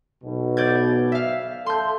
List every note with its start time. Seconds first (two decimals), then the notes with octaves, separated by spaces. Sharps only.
0.24 B1 B2
0.57 D5 G6 G#6
1.12 E5 F5
1.66 A4 C6 G6